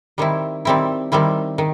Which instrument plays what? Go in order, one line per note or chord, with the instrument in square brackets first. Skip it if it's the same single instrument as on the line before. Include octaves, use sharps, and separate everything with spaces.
[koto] D#3 G3 C4 E4
D#3 G3 C4 E4
D#3 G3 C4 E4
D#3